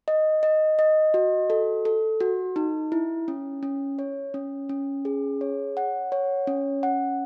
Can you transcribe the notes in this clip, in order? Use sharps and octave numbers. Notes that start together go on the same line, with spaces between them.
D#5
D#5
D#5
F#4
A4
A4
F#4
D#4
E4
C#4
C#4
C#5
C#4
C#4
G#4
C#5
F#5
C#5
C#4
F#5